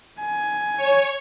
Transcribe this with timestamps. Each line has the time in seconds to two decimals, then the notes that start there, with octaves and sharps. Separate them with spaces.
0.20 G#5
0.77 C#5